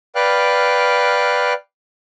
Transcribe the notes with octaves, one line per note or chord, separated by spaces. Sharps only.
B4 D5 F5 G5 F6 F#6